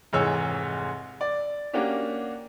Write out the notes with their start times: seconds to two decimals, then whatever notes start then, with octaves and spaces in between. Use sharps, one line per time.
0.13 F1 G#2 E3 G#3 C#5 E6
1.21 D5
1.73 A#3 C#4 D4 F#4 G4